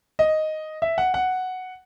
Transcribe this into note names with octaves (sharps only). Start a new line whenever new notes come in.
D#5
E5
F#5
F#5